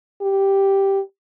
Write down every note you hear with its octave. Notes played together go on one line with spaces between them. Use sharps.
G4